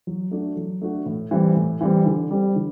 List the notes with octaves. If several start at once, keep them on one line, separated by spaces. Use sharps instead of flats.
F#3
A3 D4 F#4
F#3
A3 D4 F#4
A2
E3 G3 C4
A2
E3 G3 C4
D3
G3 C4
D3